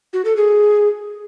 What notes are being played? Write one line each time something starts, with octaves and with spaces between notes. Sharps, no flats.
F#4
A4
G#4